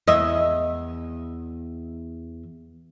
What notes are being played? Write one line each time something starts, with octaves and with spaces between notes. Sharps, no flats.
E2 D#5 E5